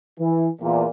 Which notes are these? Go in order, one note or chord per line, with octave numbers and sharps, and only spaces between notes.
E3
E2 A#2